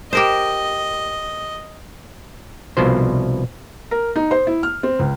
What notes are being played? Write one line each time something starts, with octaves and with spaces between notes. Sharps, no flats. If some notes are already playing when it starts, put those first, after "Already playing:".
G4 A#4 C5 D#5
C2 B2 F3 C5
A#4
D#4
C5
E4
F6
C4
C#2